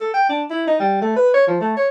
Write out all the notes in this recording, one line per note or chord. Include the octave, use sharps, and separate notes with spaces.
A4
G5
D4
E4
D#4
G3
A3
B4
C#5
F3
A3
C#5